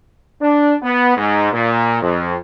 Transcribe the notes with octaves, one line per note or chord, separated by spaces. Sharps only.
D4
B3
G#2
A#2
F2